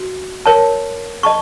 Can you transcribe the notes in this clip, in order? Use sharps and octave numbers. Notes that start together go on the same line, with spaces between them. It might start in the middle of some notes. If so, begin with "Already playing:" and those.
Already playing: F#4
A#4 C#5 A5
D#5 A5 C#6